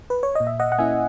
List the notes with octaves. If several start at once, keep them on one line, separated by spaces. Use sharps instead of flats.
B4
C#5
A#2 D#5
E5
D#5 F#5
F#5
A#3 C#4 E4 E5 G#5